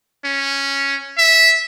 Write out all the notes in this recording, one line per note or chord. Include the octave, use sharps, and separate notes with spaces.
C#4
E5